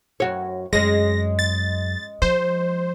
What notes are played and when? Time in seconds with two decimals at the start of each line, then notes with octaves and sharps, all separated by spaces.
0.20 F#2 F#4 C#5
0.73 F#2 G#3 C#4 A#6
1.39 A6
2.22 F3 C5